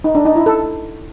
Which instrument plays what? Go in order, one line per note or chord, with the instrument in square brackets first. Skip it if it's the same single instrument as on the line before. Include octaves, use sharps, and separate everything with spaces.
[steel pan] D#4
D4
D#4
E4
A4